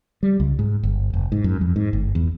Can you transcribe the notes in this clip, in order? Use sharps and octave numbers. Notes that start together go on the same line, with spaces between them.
G3
C#2
G#2
G1
F1
G#2
F#2
F2
G#2
G1
E2